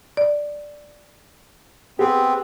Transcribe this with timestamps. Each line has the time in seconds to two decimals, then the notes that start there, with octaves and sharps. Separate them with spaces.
0.17 D5
1.99 B3 C4 G4 G#4